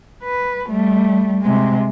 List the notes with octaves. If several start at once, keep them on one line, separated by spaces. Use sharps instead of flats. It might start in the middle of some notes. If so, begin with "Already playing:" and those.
B4
G3 A3
C3 G#3